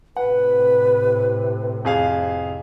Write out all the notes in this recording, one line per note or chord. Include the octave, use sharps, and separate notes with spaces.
A2 C3 B4 F#5
F2 G#4 F5